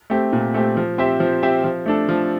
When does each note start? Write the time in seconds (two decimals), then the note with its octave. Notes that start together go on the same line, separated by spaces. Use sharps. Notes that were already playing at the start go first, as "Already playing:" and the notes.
0.10 A3 C4 G4
0.33 A#2
0.54 A3 C4 G4
0.77 F3
0.98 C4 G4 C5 E5
1.20 F3
1.43 C4 G4 C5 E5
1.64 F3
1.86 A3 D4 A4
2.09 F3